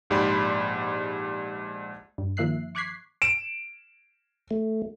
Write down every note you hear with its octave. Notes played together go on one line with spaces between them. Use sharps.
A#1 G#2 G4 D5 B5 C6
G2
D#3 F3 A#3 E5 F#6 C7
C#6 D6 F#6 G#6 B6 C7
D7 E7
A3